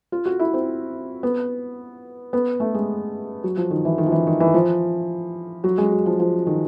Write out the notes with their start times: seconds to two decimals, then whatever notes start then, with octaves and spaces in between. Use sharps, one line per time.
0.12 F4
0.26 F#4
0.39 E4
0.54 C4
1.23 B3
2.33 B3
2.60 A3
2.74 G#3
3.44 F#3
3.57 F3
3.70 D#3
3.85 E3
3.98 D#3
4.06 F3
4.12 E3
4.27 D#3
4.40 E3
4.54 F3
5.64 F#3
5.78 G#3
5.92 F#3
6.06 F3
6.20 F3
6.47 D#3